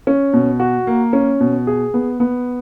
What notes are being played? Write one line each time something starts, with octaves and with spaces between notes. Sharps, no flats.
C#4
B2
F#4
A#3
C#4
B2
G#4
B3
B3